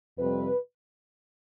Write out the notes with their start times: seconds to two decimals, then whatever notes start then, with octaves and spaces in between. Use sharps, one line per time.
0.18 F2 C3 G3 C4 B4